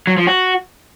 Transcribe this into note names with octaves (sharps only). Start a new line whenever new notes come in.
F#3
F3
F#4